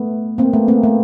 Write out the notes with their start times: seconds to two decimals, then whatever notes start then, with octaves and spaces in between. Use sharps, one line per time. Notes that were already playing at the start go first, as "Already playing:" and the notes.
Already playing: A3 B3
0.38 A#3 C4
0.53 A3 B3
0.68 A#3 C4
0.83 A3 B3